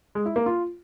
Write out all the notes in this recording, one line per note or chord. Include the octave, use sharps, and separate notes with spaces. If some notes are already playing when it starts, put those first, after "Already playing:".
G#3
E4
A#3
F4